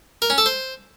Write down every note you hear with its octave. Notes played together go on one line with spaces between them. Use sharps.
A#4
C#4
A4
C5